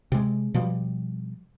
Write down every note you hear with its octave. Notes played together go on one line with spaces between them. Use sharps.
C3 G#3
B2 F3 G3